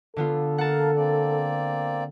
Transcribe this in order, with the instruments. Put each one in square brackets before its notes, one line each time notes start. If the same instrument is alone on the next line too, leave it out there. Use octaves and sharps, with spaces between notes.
[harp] D3 B3 F4 [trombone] A4
[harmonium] A#3 A#4 F5 [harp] F#5 A5
[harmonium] A#3 C4 D5